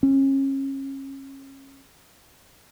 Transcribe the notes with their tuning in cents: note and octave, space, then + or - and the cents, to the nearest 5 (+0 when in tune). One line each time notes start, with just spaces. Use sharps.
C#4 -30